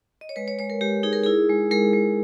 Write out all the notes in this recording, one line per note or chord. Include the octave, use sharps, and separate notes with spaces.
D#5
C#5
G#3 B4
C#5
G#3 C#5
A#4
G#3 G4
D#4 G#4
A#4
E4 G#4
G#3
G#3 A#4
G#3